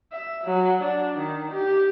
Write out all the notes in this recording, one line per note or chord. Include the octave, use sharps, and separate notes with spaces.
E5
F#3
D4
D#3
G4